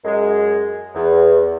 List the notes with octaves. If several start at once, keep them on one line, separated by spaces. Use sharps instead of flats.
F#2 G#3
E2